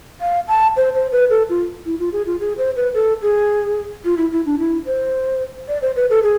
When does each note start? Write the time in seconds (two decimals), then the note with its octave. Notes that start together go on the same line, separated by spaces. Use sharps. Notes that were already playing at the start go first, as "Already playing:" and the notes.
0.21 F5
0.48 A5
0.77 C5
0.94 C5
1.12 B4
1.30 A4
1.50 F4
1.86 E4
1.99 F4
2.13 G#4
2.27 F4
2.40 G#4
2.58 C5
2.76 B4
2.94 A4
3.22 G#4
4.05 F4
4.17 E4
4.32 E4
4.46 D4
4.59 E4
4.86 C5
5.68 D5
5.82 C5
5.96 B4
6.10 A4
6.23 G#4